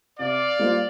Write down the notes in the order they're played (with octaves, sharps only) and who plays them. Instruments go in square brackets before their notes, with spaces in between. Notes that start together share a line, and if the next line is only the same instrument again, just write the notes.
[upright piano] C3 [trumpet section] D5 F5
[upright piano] G3 A#3 F4 C5